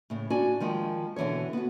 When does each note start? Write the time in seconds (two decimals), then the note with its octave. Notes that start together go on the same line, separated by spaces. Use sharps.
0.10 A2 C#3
0.30 D4 F#4 D5 G#5
0.60 D#3 F3 G#3
1.16 B2 D3 E3 G#3 C#5
1.53 B3 F#4